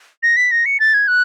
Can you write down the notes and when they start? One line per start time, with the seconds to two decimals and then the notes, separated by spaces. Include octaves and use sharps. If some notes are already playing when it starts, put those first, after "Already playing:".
0.23 A#6
0.37 B6
0.51 A#6
0.66 C#7
0.80 A6
0.94 G#6
1.08 F#6